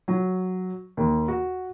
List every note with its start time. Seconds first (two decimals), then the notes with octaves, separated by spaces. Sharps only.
0.08 F#3
0.97 D#2
1.28 F#4